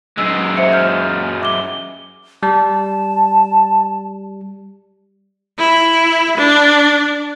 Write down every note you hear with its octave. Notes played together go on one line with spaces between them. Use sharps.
F#2 G#3 E6
C5 E5 C#7
F6 G6
E5 D6 G7
G3 A5
E4
D4